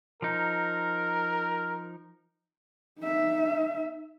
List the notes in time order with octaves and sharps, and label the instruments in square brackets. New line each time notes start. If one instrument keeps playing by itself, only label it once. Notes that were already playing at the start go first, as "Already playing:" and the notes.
[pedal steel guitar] F3 D#4 [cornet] A#4
[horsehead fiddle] D#4 E5